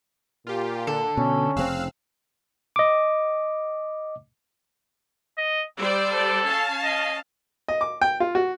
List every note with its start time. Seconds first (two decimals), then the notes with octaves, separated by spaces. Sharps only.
0.47 A#2 F4 G4
0.87 D3 A4
1.17 B2 C#4
1.57 F1 C#3 C4 F5 E6 F#6
2.76 D#5 D6
5.37 D#5
5.78 G3 C5 D5 E6
6.12 A4
6.45 C#4 F5 A5
6.84 D#5
7.68 D#5
7.81 D6
8.02 G5
8.20 F4
8.35 F#4